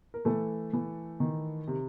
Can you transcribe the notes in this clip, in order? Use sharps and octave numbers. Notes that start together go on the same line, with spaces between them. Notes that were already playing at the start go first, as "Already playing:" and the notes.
A#4
E3 A3 A4
E3
D#3
C3